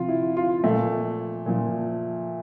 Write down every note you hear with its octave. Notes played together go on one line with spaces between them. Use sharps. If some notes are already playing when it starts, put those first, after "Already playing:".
Already playing: C3 F3 F4
E4
F4
A#2 F3 A3
A#2 F3